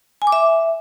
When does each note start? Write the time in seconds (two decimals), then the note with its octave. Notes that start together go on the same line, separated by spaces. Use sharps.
0.22 G#5
0.27 D6
0.32 E5